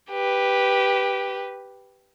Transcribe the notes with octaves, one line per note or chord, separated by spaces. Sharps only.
G4 B4